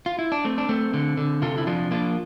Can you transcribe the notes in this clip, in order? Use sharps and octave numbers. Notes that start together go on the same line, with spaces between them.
F4
E4
D4
A3 C4
D4
A3 C4
D3
D3
C3 F4 A4
E4
F3 D4 F4
A#3 D4 F4